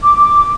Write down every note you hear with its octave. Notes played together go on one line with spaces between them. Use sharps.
D6